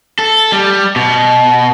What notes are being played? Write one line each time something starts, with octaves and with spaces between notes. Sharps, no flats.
A4
G3
B2